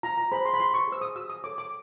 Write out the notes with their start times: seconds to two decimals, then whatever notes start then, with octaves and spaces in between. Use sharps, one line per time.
0.03 F4 A#5
0.18 A#5
0.32 G#4 C5 B5
0.45 C6
0.54 B5
0.60 F4 C6
0.74 C#6
0.88 G#4 C5 E6
1.01 D#6
1.16 F#4 E6
1.30 D#6
1.44 A4 C#5 D6
1.58 D6